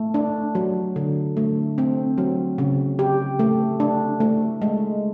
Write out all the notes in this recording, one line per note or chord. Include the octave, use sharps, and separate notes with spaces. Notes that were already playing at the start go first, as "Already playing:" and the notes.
Already playing: A3
D4
F#3
D3
A3
C4
F#3
C#3
G4
A3
D4
A3
G#3